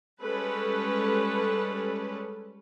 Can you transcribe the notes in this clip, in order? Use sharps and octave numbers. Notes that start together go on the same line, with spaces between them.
G3 G#3 C#4 A4 B4